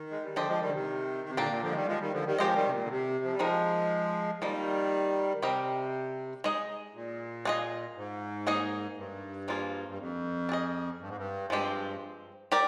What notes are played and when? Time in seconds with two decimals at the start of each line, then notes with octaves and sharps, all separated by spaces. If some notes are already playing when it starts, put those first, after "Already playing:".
Already playing: D#3
0.11 G#3
0.23 G3
0.36 D3 F3 D4 G4 C5 D#5
0.48 F3 G#3
0.61 D#3 G3
0.67 D3
0.73 C3 D#3
1.28 C3
1.37 A#2 D3 A#3 D4 G4
1.50 A#2
1.62 D3 F3
1.71 G#3
1.75 D#3 G3
1.87 F3 G#3
2.00 D#3 G3
2.13 D3 F3
2.26 D#3 G3
2.38 F3 G#3 C4 G4 C5 D#5
2.55 D#3 G3
2.67 C3
2.73 A#2
2.84 D3
2.90 C3
3.24 F3
3.32 G3
3.39 F3 G#3 C4 D#4 A#4
4.42 D#3 F3 G3 A#3 D#4
5.42 C3 G3 C4 G4 A#4 D#5
6.44 G#3 D#4 G#4 D#5
6.94 A#2
7.45 D4 F4 G#4 D#5
7.96 G#2
8.47 A#3 D#4 G#4 D#5
8.97 G2
9.48 F3 A#3 F4 G#4
9.89 G2
9.99 F2
10.49 D4
10.52 G#4 D#5
11.01 G2
11.08 G#2
11.17 G2
11.50 G2 F3 G#3 C4 G4
12.52 G4 A#4 D5